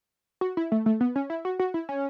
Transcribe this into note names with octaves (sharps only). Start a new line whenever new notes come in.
F#4
E4
A3
A3
B3
C#4
E4
F#4
F#4
E4
C#4